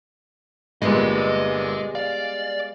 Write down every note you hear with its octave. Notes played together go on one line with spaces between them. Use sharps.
G1 A#2 G3 G#3 B3 D#5 C6
D5 F5